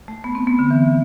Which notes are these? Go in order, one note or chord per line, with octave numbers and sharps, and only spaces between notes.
A3
B3
C4
B3
D3
E3